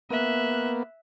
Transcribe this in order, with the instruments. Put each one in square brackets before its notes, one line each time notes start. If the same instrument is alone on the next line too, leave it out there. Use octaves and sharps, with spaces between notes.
[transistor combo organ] A#3 B3 [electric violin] E5 F#6